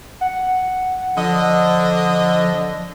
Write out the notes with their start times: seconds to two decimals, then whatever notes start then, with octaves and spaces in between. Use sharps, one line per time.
0.21 F#5
1.17 D3 F3 D#5